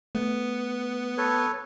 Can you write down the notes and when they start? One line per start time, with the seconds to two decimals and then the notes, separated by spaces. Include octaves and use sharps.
0.15 A3 B3
1.18 A4 B4 C#5